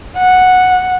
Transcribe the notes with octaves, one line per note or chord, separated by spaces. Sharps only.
F#5